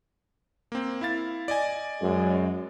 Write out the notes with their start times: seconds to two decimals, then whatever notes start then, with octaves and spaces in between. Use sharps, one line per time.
0.72 A#3 C4
1.01 E4 F5 A6
1.48 D5 D#5 G#5
2.02 F#2 G#3